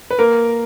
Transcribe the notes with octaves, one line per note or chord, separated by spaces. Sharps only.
B4
A#3 A#4